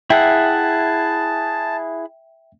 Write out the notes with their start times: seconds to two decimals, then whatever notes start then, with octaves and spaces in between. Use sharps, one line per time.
0.10 E4 G#4 E5 F#5 G5 A5